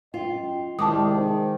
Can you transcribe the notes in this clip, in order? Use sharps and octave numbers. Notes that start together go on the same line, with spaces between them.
F#2 F4 D#5 G5
C2 D#3 G#3 A5 D6 D#6
D#4 G#4 C5